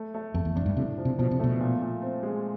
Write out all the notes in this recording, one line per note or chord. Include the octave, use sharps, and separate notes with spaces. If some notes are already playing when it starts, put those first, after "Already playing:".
Already playing: A3
A3
F2 A3
E2
F2 D4
G2
A2 C3
F3
C3
B2 F3
C3
B2 A3
A#2
A#2
C4
G#3